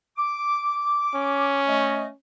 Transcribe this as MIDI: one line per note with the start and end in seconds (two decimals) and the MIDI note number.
0.17 1.61 86
1.15 2.15 61
1.67 2.06 57
1.67 2.06 75